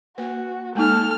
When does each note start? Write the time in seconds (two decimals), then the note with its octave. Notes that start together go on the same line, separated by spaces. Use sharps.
0.18 A#3 F#4 B4
0.75 G#3 A#3 D#4 A4 F6